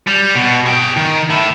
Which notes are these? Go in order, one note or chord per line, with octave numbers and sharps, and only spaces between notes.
G3
B2
G#4 G5
D#3
A2 E4